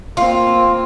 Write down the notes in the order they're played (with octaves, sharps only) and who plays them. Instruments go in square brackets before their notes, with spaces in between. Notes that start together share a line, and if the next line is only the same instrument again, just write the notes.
[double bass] A#3 C4 [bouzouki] F4